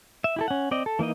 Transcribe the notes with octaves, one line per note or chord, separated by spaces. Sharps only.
E5
E4 G4 A4
C#4 F#5
C4 D5 D#5
A4
E3 A#3 D#4 D#5